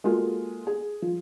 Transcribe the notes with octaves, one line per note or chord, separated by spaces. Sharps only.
G#3 A#3 F4 F#4 G#4 A4
G#4
F3